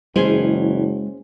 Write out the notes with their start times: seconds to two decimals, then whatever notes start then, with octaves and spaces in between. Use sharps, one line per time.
0.16 F#1 E3 G#3 C#4 G#4 C5